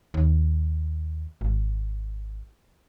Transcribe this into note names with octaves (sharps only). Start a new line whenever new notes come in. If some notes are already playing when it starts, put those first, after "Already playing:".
D#2
G#1